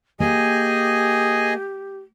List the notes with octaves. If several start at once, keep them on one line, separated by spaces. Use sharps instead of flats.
A#3 G4 G#4 D#5 G#5